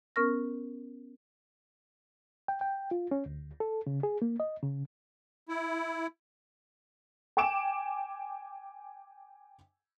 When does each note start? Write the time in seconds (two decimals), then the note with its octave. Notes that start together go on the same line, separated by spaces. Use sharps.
0.16 B3 C#4 A#4 C#6 F6 A#6
2.48 G5
2.61 G5
2.91 F4
3.11 C#4
3.26 D2
3.60 A4
3.87 C#3
4.03 G#4
4.22 A#3
4.40 D#5
4.63 C#3
5.49 E4
7.37 G5 G#5 D6 D7 E7